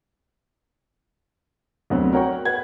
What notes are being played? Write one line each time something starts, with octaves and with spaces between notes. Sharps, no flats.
D2 F#3 B3 C4
F#4 A#4 C#5 F#5 G5 C#6
B4 F#5 G#6